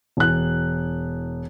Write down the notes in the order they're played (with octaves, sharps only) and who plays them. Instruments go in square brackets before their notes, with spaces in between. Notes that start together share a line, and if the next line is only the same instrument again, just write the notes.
[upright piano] E1 F#6